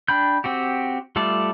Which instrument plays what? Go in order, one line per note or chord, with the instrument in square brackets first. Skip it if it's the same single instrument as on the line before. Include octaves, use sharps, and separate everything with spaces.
[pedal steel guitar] D4 G5 B5 G6
C4 F#4 G4
G3 A3 F4 A4 D5